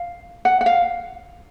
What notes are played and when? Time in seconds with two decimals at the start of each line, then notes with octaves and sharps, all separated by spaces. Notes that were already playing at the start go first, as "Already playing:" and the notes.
Already playing: F5
0.45 F#5
0.61 F#5
0.66 F5